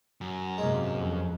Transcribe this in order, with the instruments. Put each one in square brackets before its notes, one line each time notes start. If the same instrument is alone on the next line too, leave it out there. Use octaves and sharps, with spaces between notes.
[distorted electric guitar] F#2
[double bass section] G#2 C3 A#3 [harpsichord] G#3 D#4
[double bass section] F2